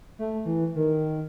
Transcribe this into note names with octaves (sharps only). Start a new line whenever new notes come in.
A3
E3
D#3